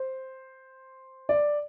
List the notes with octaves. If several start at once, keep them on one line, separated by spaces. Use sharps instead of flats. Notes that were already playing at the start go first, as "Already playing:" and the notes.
Already playing: C5
D5